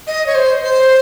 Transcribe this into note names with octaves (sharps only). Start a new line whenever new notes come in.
D#5
C#5
C5
C5